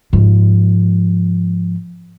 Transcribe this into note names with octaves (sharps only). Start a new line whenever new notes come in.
G#2 F3